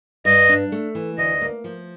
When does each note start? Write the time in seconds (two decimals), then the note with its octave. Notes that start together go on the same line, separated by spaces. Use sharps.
0.25 G2 D#5
0.49 D4
0.72 A3
0.95 E3
1.18 D2 D#5
1.42 A#3
1.64 F3